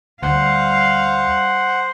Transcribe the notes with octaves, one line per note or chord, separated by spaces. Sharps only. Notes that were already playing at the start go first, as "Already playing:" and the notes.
D2 G3 C5 F5 F#5